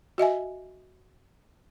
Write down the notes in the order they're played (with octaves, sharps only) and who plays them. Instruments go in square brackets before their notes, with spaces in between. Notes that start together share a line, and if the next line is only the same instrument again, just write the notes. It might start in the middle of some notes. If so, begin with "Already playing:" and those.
[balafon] F#4 D#5 E5 G#5